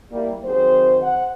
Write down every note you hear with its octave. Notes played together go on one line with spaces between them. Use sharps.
G3 A#3 E4
D#3 F#3 C4 G#4 C5
F#5